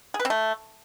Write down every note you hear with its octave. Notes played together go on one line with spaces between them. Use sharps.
G#4
B4
C4
A3